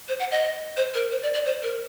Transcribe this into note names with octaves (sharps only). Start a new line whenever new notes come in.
C5
F#5
D#5
C5
A#4
C5
D5
D5
C5
A#4